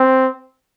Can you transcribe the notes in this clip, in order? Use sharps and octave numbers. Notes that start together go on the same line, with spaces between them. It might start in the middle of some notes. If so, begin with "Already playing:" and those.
Already playing: C4